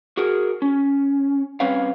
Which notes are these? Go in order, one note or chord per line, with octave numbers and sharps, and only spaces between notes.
F#4 G#4 A#4
C#4
G3 C4 C#4 B4 C#5 F5